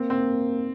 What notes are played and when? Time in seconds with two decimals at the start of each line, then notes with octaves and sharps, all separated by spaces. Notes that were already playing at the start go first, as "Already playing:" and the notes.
Already playing: A#3 C4
0.10 C4